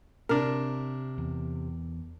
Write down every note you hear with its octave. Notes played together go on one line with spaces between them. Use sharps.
C3 D4 A#4
E2